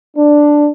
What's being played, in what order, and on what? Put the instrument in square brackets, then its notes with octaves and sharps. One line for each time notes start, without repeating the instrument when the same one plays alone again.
[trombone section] D4